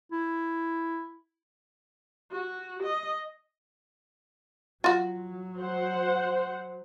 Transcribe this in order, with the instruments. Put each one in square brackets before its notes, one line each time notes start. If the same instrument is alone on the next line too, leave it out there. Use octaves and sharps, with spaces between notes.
[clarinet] E4
[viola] F#4
D#5
[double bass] F#3 [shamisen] F4 F#4
[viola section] C5 F#5